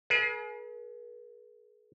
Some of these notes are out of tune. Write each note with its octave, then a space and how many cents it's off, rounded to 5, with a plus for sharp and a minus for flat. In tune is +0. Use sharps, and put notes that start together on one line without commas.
G#4 +35 B4 -45